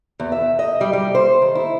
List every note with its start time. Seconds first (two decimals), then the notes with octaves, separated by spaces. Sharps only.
0.20 E2
0.32 E5
0.59 D#5
0.81 G3
0.93 G3
1.15 C5
1.42 D#3
1.55 E4